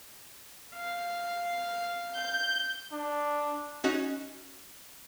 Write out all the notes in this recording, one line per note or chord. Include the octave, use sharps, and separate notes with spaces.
F5
G6
D4
C#4 D#4 F#4